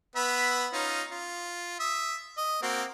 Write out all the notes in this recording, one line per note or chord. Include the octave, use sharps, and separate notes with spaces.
B3 E5 B5
C#4 D#4 F4
F4
E5 D#6
D#5
A#3 C4 F#4